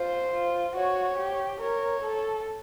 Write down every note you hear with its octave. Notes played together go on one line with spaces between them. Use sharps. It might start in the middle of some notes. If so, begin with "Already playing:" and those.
Already playing: F4 C5
F4
F#4 C#5
G4
A#4 C#5
A4